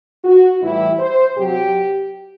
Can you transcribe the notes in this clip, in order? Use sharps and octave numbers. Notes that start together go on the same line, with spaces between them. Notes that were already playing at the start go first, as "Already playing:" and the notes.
F#4
A2 E3 G3 E4
C5
C3 F#3 G4